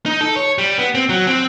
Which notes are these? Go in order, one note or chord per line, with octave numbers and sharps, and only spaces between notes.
D#4
A4
C#5
G3
B3
C4
F#3
C4